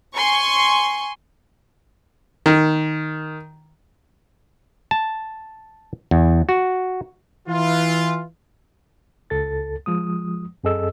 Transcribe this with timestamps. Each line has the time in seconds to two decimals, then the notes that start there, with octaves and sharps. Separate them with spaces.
0.16 G#5 C6 C#6
2.46 D#3
4.91 A5
6.11 E2
6.49 F#4
7.48 E3 F4
9.30 C#2 A4 A6
9.86 F3 G#3 D#6
10.64 F#2 C4 G#4 A4 D#5 E6